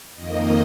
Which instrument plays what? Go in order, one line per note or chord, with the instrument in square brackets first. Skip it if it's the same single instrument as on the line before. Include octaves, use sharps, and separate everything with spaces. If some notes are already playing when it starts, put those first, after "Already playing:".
[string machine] F2 D#3 A#3 D#5